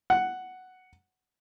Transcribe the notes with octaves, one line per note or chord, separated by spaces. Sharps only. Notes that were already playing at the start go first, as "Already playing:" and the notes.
F#5